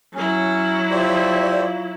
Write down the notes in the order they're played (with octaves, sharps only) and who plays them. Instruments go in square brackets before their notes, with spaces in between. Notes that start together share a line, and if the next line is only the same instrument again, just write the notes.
[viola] F#3 E4 [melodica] C#4
[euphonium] F4 [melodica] G4 C5 E5 [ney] D5